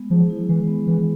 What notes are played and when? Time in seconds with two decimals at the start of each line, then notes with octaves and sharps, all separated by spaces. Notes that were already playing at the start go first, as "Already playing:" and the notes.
Already playing: G#3 B3
0.10 F3 G#4
0.30 E4
0.49 E3 G#3
0.67 B3
0.87 E3 G#4